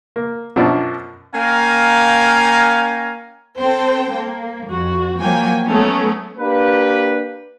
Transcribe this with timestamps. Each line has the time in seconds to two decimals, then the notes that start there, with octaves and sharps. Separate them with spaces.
0.16 A#3
0.56 F#2 B2 F3 D4
1.34 A#3 C#4 F5 G5 G#5 A#5
3.60 C4 A4 C5 G5
4.15 A#3
4.68 F2 F#4
5.19 F3 F#3 A#3 G5 G#5
5.66 F#3 A3 B3 C#4
6.39 A#3 D4 G4 B4